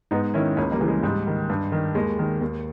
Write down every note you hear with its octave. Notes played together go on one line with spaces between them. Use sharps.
G#2 B3 D#4
D#3 C#4 E4
C#2 A#3 C#4
G3 A#3
C#3 E3
G#3
G#2 G3
D#3
G2
D#3
D#2 G#3
D#3
D#2